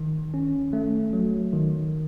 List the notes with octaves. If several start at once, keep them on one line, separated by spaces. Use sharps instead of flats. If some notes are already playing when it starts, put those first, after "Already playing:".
Already playing: D#3
C#4
A3
F#3
D#3